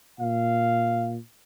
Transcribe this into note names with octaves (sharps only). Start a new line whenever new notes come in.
A#2 F5